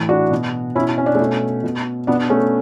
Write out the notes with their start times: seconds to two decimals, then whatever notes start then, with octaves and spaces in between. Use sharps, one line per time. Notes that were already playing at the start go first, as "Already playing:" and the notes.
Already playing: A2 E3
0.09 D4 F#4
0.31 B2
0.75 B2 C#4 E4
0.98 C#4
1.06 D4
1.15 A3 C#4
1.20 B2
1.64 B2
2.07 B2 B3 D4
2.30 A3 C#4